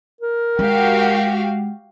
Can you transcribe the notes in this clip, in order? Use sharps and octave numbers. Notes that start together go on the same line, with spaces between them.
A#4
G#3 F#4 G4 F5